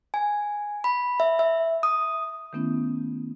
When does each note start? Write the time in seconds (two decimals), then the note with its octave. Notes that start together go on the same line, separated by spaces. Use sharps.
0.14 G#5
0.84 B5
1.20 E5
1.39 E5
1.83 D#6
2.53 D#3 A3 B3 C#4 E4